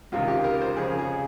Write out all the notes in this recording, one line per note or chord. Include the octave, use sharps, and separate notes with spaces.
C#2 C3 D#3 F4
G4
A#4
C5
F2 C#3 G#4
G#4